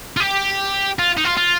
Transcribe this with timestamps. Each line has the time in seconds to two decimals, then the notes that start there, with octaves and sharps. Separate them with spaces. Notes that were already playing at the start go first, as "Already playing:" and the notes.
0.17 F4
0.20 G4
0.99 F4
1.17 D#4
1.25 F4
1.37 F4